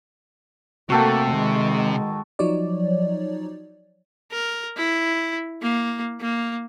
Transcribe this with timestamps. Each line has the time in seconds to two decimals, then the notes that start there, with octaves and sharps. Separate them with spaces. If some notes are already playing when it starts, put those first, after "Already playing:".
0.90 C3 A3 A#3 F#4 A4 G5
1.31 D#3 G#3
2.39 F3 F#3 D#4 C#5 D5
4.32 A#4
4.77 E4
5.62 A#3
6.20 A#3